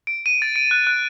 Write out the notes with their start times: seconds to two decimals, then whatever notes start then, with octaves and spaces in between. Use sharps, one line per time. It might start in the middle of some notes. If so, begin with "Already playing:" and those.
0.07 D7
0.26 D#7
0.42 A6
0.56 D7
0.71 F#6
0.87 F#6